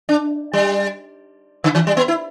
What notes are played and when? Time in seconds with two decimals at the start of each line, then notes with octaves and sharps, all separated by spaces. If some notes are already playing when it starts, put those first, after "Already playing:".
0.09 D4
0.53 G3
1.64 D3
1.75 E3
1.87 G3
1.97 B3
2.08 E4